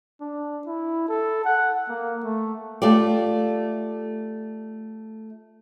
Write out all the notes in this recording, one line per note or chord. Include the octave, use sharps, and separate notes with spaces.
D4
E4
A4
F#5
A#3
A3
A3 F4 G4 D5